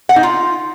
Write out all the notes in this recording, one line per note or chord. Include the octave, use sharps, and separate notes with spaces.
F#5
D#4
F4